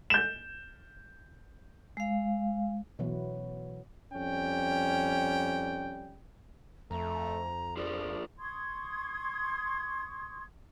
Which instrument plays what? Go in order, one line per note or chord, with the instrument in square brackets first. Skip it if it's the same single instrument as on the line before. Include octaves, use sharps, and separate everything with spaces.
[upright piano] G6 E7
[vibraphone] G#3 F5
[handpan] B2 E3 F#3 B3
[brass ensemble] F2 G3 C#4 G5
[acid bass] F2 [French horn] A3 [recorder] A#5
[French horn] F3 [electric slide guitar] F4 G#4 A#4 [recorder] D5
[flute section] C6 C#6 D#6 G#6